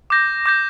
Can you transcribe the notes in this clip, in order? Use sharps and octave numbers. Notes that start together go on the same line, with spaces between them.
D6 G6 A#6
D6 G6 A#6